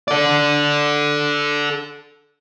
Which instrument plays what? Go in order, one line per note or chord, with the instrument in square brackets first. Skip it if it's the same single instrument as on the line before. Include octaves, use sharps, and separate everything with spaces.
[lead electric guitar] A4 D5